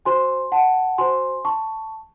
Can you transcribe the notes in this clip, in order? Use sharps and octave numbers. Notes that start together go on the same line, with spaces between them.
F#4 C5 G#5 C6
F#5 A5
F#4 C5 G#5 C6
A5 C#6